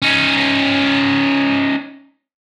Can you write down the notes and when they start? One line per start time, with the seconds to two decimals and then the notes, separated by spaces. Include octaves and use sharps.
0.02 C#4 D#4